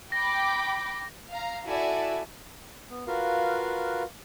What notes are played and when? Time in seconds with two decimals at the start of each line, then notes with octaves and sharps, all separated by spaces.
0.12 G5 B5 D6 A#6
1.31 F5 A#5
1.64 E4 F#4 A4 D5 E5 G#5
2.90 B3
3.07 F4 F#4 A#4 B4 F5